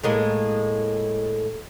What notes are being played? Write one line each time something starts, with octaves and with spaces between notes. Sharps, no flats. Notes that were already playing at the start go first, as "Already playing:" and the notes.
A2 G#3 A#3